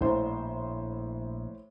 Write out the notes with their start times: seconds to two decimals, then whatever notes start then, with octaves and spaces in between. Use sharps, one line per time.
0.01 A#1 A2 C5